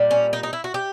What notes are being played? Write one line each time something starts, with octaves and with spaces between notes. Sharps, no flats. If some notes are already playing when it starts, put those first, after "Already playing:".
Already playing: A#2 G3
C#4
D#4
D#4
E4
F#4
G4